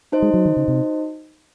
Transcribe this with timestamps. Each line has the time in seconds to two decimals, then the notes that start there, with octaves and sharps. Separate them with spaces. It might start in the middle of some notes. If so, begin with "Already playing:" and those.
0.12 D#4 F#4 C5 D#5
0.22 G#3
0.34 F#3
0.45 D#3
0.57 C#3
0.68 C3